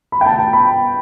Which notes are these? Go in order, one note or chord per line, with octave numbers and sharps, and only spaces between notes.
B5
G5
A5
A5
B5